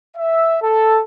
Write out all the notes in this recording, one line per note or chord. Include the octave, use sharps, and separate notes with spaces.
E5
A4